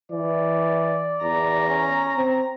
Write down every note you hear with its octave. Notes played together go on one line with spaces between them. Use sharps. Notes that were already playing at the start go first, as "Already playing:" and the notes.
E3 D5
E2 A#5
C#4
C4